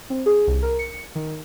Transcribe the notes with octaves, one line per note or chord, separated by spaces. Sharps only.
C4
G#4
C2
A#4
C#7
D#3